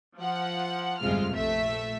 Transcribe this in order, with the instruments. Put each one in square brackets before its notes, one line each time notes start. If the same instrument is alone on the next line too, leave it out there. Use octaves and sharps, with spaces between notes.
[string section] F3 F#5
G1 F2 C3 G#3 F4 F6
A#1 A3 E5